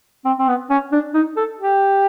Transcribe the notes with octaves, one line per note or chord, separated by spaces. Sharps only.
C4
C4
B3
C#4
D4
D#4
A4
G4